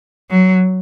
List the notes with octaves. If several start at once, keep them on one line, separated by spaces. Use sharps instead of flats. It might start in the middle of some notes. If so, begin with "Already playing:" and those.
F#3